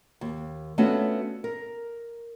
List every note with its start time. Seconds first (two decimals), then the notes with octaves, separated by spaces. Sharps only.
0.21 D#2
0.78 A3 B3 C#4 D4 F4 F#4
1.44 A#4